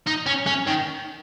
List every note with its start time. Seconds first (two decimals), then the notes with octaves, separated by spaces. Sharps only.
0.07 D#4
0.26 C#4
0.46 C#4
0.67 D#3